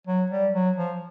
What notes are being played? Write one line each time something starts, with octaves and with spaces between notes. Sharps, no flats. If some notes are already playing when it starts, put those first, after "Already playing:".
F#3
G3
F#3
F3